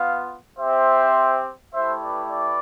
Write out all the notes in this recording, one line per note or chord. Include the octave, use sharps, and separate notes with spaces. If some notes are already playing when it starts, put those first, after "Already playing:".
Already playing: B3 F4 F5
C4 G4 C5 E5
A3 E4 G4 C5 E5
B4 D5
B4 D5